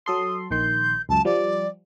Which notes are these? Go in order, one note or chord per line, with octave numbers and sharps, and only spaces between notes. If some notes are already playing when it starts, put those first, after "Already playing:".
F#3 A4 C6 D#6
A#1 D#3 C6 G6
C#2 F#2 A5
F3 G3 D5